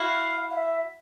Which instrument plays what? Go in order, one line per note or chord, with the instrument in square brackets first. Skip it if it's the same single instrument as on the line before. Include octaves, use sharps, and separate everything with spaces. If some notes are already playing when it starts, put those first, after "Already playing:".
Already playing: [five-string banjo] E4 F#4 [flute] F5
[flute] F5
E5